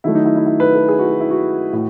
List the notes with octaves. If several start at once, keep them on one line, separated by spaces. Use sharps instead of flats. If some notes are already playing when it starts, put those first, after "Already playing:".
D#3 F#3 A3 E4
D#4
E4
E4
E4
B4
A4
G#4
F#4
F#4
E4
F#4
A2